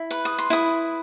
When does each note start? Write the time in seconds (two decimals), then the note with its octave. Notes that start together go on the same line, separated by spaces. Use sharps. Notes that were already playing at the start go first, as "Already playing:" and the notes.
Already playing: E4
0.11 B4
0.25 D#6
0.38 C6
0.50 E4 D#6